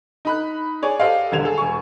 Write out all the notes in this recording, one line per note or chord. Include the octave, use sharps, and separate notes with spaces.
D#4 B5 F#6
G#4 C#5 D5 G#5
G4 A4 C5 D5 D#5 F5
E1 D3 G3 G#6 E7 F7
G#4 A4
E1 G#5 C#6